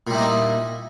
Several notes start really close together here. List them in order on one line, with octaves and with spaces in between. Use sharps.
A#2 G3 E4 D#4 A#3